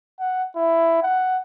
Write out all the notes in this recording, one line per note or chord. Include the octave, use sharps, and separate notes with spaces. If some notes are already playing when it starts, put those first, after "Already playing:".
F#5
E4
F#5